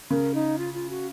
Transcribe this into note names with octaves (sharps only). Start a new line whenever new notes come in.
C#3 A#4
D#4
F4
F4
F#4